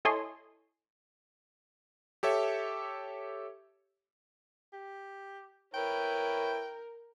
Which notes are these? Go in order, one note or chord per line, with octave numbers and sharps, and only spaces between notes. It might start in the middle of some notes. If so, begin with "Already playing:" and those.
E4 A4 C#5 D#5 G#5 C6
G4 A4 C#5 E5
G4
E4 A#4 B4 C#5 G5